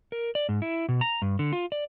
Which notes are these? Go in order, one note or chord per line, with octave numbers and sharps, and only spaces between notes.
A#4
D5
G#2
E4
B2
A#5
G2
D3
F4
D5